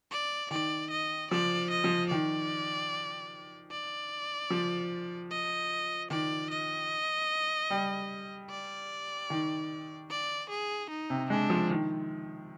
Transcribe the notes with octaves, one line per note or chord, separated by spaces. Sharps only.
D5
D#3 D5
D#5
F3 D5
D#5
F3
D#3 D5
D5
F3
D#5
D#3 D5
D#5
G3
D5
D#3
D5
G#4
D#4
C3
G#3 D4
F3
D#3